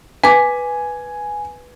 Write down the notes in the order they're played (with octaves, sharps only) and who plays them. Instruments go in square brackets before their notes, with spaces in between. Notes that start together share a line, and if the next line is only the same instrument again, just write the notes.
[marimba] B4 D6 [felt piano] G#5